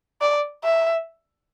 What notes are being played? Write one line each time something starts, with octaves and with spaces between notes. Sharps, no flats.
D5
E5